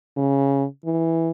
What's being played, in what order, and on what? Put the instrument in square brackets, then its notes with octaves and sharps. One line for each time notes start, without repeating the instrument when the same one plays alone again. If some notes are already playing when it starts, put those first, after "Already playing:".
[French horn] C#3
E3